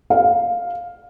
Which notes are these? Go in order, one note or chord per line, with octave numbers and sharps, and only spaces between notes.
F5